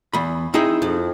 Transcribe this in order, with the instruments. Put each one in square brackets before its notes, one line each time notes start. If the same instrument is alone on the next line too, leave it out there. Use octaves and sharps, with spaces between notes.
[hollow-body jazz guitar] E2 B5
[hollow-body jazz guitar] C4 D#4 G#4 [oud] E4
[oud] F2